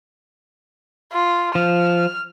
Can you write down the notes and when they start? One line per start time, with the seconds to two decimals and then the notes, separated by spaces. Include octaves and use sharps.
1.12 F4
1.55 F3 F6